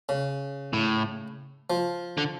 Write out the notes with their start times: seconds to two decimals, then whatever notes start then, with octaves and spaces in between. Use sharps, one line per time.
0.09 C#3
0.73 A2
1.70 F3
2.18 D3